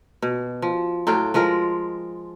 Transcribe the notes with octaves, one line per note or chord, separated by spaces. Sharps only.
B2
F3
A2 F#3 F4 G5
F3 G#3 F4 A#4